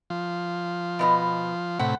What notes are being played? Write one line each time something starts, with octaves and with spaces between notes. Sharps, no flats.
F3
B2 B3 D#5
A2 C3 F#5 B5